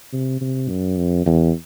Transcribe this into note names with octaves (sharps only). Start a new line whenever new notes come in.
C3
C3
F#2
F2
E2